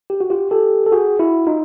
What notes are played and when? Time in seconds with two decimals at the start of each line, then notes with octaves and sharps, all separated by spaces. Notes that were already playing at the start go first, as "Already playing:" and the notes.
0.10 G4
0.21 F#4
0.30 F4 G4
0.51 G4 A4
0.87 A4
0.92 F#4 G#4
1.19 E4 F#4
1.47 D#4 F4